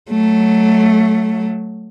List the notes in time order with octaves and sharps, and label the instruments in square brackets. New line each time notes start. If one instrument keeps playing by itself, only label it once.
[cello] F#3 A3